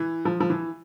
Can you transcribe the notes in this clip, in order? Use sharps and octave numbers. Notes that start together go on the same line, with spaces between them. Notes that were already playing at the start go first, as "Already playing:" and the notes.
Already playing: E3
F3
F3
E3